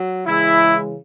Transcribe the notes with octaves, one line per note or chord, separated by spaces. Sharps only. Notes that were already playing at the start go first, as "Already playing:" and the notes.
Already playing: F#3
C#3 E3 G#3 E4